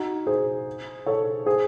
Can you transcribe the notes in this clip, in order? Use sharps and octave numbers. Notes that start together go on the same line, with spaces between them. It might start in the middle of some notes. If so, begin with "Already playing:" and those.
Already playing: D#4 F#4
G#4 C5
A4 C#5
G#4 C5